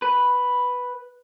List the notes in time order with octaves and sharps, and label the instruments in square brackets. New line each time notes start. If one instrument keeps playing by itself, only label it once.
[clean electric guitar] B4